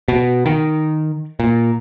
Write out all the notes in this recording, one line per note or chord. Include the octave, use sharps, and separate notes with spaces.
B2
D#3
A#2